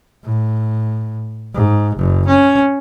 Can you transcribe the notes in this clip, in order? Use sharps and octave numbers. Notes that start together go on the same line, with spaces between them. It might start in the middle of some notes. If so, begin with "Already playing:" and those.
A2
G#2
F#1
C#4